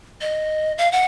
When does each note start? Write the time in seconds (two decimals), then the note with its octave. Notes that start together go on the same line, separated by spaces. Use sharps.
0.21 D#5
0.78 F5
0.92 F#5